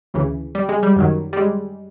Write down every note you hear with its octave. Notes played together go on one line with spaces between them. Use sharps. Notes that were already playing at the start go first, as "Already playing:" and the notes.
D2 C#3 E3
G3
G#3
G3
F#2 D#3 F#3
G3
G#3